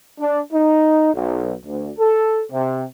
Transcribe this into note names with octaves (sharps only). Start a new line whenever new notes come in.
D4
D#4
B1
D2
A4
C3